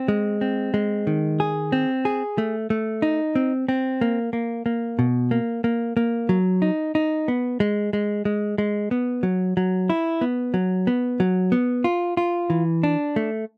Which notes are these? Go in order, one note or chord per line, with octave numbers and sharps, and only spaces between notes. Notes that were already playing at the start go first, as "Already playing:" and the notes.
Already playing: C4
G#3
C4
G#3
D#3
G#4
C4
G#4
A3
A3
D#4
C4
C4
A#3
A#3
A#3
B2
A#3
A#3
A#3
F#3
D#4
D#4
B3
G#3
G#3
G#3
G#3
B3
F#3
F#3
E4
B3
F#3
B3
F#3
B3
F4
F4
E3
D4
A3